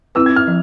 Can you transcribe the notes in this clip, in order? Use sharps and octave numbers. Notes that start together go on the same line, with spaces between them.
C4 E4 B4 E6
G#6
F6
F3